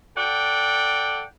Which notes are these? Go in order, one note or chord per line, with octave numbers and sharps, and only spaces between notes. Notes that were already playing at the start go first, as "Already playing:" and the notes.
A4 D5 F#5 G5